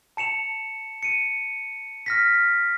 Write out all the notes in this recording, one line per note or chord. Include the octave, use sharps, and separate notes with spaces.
A5 C#7 E7 F7
C#7 D#7
F6 A#6 B6